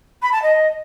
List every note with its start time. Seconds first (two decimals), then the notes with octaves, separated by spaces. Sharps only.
0.22 B5
0.32 A5
0.43 D#5